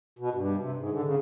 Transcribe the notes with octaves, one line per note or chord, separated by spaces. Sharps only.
B2
G2
C3
G#2
D3
C#3